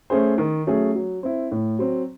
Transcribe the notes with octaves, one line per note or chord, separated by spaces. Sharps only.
A3 C#4 G#4 C5
D#3
F#3 A3 C#4 G#4
F#3
C4 E4
A2
F#3 C4